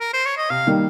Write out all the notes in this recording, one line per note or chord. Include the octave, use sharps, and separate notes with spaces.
A#4
C5
C#5
D#5
C3 F5
D#3 G3 A#3 D#4